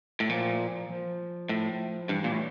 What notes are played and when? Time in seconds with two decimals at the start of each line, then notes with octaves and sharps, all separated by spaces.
0.20 A2
0.29 A#2 F3
0.89 F3
1.49 A2
2.09 G2 E3
2.24 A#2
2.32 A2